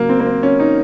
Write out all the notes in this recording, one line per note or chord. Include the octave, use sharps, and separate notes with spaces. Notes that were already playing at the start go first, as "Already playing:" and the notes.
Already playing: C#3 F#3 A#3
C4
A#3
C4
C#4
D#4